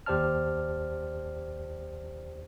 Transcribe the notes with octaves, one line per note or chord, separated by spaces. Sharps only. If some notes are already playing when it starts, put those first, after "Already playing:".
D#2 G4 C5 D5 A5 F6